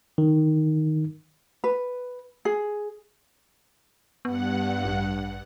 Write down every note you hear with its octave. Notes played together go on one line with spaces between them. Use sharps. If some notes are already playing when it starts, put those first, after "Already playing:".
D#3
B4
G#4
G2 B3 F#5
A1